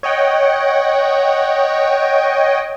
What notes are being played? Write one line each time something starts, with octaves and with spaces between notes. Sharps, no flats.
C#5 D#5 F#5 G5